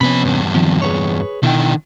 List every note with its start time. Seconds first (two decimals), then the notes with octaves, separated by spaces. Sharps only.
0.01 C3 F3 B3 C#4 B5
0.25 E2 G2
0.55 D#3 F3 C4
0.82 G#4 B4 C#5
1.43 B2 D3 D#3 E4 G5